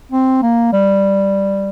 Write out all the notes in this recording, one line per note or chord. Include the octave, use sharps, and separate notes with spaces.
C4
A#3
G3